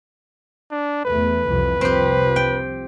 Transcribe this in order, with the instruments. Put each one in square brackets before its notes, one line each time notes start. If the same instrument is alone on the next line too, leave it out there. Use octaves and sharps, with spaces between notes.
[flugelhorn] D4
[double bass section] E2 A3 [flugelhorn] B4
[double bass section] C2 F2 E3
[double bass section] C2 F3 [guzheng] C4 G4
[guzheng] G5